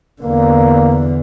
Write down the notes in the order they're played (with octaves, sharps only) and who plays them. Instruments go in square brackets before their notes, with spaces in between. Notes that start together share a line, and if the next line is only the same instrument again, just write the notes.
[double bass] E2 D3 [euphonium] A#3